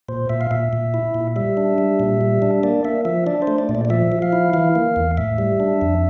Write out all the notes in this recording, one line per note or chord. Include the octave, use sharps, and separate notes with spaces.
A#2 C5
A#2 E5
F5
A#2 E5
A#2
E4
A#2
G3 E5
D4
G3
A#2
G3
D4
A#3 D5
A#3 E5
F3 E5
D4 D5
C5
A3
D5
A#2
D5
D5
F3 E5
F3
F5
E4
E3 F5
A#3
E2
A2 E5
G3
D4
F2